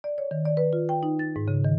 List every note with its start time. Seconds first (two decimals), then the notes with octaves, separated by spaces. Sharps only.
0.04 D5
0.18 C#5
0.31 D#3
0.45 D5
0.57 B4
0.73 F4
0.89 G5
1.03 D#4
1.19 A6
1.36 G#2
1.48 C#3
1.65 D#3